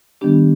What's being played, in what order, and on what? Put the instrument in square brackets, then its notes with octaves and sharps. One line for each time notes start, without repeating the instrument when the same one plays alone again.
[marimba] D#3 G3 B3 D4 G4